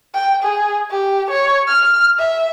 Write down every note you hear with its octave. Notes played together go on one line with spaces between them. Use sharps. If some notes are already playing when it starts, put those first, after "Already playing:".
G5
G#4
G4
C#5
F6
E5